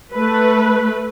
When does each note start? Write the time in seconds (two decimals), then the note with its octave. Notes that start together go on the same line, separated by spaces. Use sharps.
0.16 A3 B4